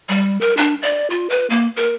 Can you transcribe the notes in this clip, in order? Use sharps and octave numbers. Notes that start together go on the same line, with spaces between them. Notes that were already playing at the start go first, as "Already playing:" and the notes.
G3
A#4
D4
D5
F4
B4
A#3
A#4